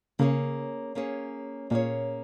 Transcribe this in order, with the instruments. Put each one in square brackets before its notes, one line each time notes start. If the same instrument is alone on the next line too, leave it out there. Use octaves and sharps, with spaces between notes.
[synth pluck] C#3 [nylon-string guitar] A#3 C#4 G#4 C#5
[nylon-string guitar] A#3 C#4 G#4 C#5
[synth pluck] A#2 [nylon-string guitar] A#3 C#4 G#4 C#5